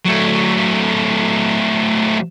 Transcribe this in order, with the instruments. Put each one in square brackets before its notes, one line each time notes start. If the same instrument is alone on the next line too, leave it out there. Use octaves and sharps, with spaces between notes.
[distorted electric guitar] F#3 A3